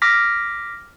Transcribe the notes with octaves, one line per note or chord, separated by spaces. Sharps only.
D6 F6 A#6 B6